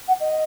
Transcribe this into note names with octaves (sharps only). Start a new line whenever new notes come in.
F#5
D#5